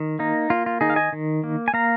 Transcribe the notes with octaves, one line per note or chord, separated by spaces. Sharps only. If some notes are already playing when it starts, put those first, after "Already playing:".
Already playing: D#3
A#3 D#4
A#3 F4
F4
D#3 D#4 G#4
F5
D#5 G#5
D#3
A#3
G#5
A#3 F5 A#5